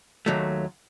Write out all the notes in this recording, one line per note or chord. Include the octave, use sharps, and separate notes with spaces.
D#2 D#3 F#3 A3